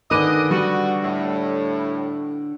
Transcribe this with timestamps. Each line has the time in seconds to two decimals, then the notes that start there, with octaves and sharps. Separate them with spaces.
0.11 D3 D#3 G#4 B4 D#5 D6 D#7
0.51 G3 F#4
1.04 A2